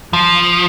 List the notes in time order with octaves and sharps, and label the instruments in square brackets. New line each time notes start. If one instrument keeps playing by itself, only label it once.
[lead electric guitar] F3